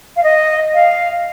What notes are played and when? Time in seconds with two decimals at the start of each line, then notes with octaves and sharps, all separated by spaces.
0.16 F5
0.23 D#5
0.73 F5